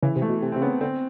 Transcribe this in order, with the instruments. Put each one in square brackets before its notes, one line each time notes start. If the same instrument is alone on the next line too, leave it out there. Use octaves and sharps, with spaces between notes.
[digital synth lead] C#3 [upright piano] E3
[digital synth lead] C3
[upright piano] A3
[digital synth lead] B2
C3
[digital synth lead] C3 [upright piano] C4
[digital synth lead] C#3 [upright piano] B3
[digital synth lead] D3 [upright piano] C4